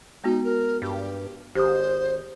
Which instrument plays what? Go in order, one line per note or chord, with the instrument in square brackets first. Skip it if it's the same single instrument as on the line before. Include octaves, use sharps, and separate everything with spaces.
[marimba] G#3 B3 F#4 [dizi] D#4
[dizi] A#4
[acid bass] G2 [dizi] G4
[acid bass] G#1 [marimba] G4 D#6 [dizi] C5